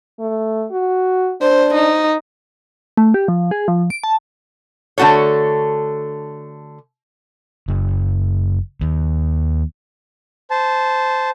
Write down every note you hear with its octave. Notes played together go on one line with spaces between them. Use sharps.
A3
F#4
D4 C5
D#4
A3
G4
F3
G#4
F3
D7
A5
D3 A3 F#4 A4 C#5
F#1
D#2
C5 A5